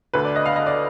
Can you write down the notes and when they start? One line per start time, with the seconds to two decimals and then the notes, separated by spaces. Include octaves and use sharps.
0.14 D2 D3 B4
0.25 D5
0.36 D#5
0.46 F5
0.56 D#5
0.66 D5